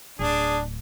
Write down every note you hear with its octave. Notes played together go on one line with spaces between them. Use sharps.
D1 D4 G#4